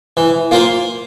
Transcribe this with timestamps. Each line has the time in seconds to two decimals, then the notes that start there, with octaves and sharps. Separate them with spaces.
0.17 E3
0.51 A#3 F4 C5